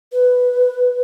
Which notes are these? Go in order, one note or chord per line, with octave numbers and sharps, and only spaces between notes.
B4